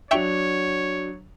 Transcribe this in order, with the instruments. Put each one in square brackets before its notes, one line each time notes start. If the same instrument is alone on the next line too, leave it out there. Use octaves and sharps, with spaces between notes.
[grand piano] F#3 D4 F7 [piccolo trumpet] C#5 [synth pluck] E5 G5 C#6